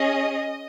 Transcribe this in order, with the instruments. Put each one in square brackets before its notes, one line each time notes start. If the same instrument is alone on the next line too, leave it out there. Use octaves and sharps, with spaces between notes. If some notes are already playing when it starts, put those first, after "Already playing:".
Already playing: [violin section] C#4 G#4 D#5